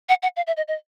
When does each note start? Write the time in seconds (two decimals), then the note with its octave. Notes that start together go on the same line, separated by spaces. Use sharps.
0.09 F#5
0.23 F#5
0.36 F5
0.47 E5
0.57 D#5
0.68 D#5